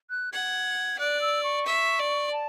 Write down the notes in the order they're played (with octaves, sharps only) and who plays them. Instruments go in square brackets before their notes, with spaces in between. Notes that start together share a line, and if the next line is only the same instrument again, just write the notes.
[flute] F#6
[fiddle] F#5 [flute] G#6
[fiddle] D5 [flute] F#6
[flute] E6
C#6
[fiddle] E5
D5
[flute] A5